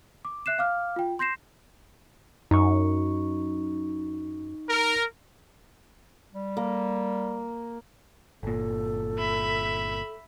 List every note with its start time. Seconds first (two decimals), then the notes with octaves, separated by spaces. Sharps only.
0.25 D6
0.46 E5 F#6 C7 E7
0.59 F5 D6 F6
0.96 F4 G5
1.19 C6 G6 A#6 C7 E7
2.51 F#2 D#4 C#6
4.69 A#4
6.33 G3
6.57 A#3
8.43 G1 A#2 A4
9.18 E5 B5